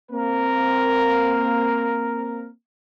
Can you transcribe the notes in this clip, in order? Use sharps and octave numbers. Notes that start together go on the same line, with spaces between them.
A#3 C4 A#4